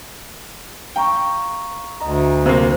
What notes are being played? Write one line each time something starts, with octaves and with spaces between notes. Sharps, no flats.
F5 G5 A#5 C#6
D2 D#5 A#5
C3 A#3 C5 F5